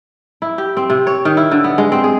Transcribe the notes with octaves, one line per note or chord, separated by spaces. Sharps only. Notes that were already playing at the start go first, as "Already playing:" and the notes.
E4
G4
C4
C3
C#5
D#3
E4
D3
B3
G#3
C4
G#4